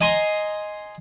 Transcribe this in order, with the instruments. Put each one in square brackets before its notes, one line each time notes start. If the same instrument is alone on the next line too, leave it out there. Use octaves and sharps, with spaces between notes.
[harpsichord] D#5 G#5 A#5 C6